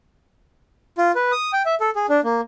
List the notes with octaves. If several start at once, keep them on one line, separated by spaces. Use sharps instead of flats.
F4
B4
D#6
G5
E5
A4
G#4
D4
A#3